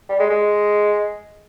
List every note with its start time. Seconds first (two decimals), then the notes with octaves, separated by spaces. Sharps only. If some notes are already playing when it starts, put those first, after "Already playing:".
0.09 G3
0.20 G#3
0.30 G#3